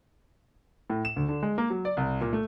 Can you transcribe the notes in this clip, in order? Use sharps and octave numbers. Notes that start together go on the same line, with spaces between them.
A2
E7
D2
D3
G#3
A#3
F#3
D5
C2
A#2
A3